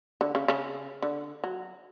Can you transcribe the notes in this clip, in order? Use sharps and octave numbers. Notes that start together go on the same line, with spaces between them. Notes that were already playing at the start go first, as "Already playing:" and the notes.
D3
C#3
C#3
D3
F#3